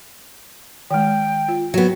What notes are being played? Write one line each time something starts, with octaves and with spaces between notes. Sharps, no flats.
D#3 G#3 G5
F4
F#3 B3